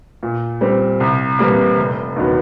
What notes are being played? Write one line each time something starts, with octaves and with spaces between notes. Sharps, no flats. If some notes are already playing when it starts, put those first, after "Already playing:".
A#2
G3 C4
C2
C3 E3 G3 A#3
F1
D#2 D#3 F#3 B3